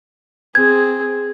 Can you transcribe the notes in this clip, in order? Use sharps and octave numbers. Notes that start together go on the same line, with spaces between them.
C4 G#4 G#6